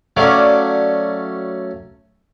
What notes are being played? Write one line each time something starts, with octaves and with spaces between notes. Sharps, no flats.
F#3 A3 C#4 D5 F5